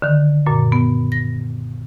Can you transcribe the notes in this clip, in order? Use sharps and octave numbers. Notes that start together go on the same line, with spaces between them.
D3 D#3
F#2 A#2
B3
A#6